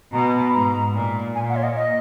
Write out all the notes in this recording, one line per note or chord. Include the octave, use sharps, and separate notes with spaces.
B2 A#5
B5
G#2 A#5
A#2
A#2 G#5
F#5
C#5
D#5
D#5